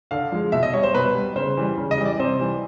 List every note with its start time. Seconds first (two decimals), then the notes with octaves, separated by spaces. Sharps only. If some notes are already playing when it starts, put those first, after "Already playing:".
0.11 D3 F5
0.32 F3 G#3
0.52 B2 E5
0.63 D#5
0.73 G3 C#5
0.83 C5
0.94 B2 B4
1.15 G3
1.35 C#3 C5
1.57 E3 G3
1.78 C#3
1.91 D#5
1.98 E3 G3
2.05 D5
2.19 C3 C5
2.39 E3 G3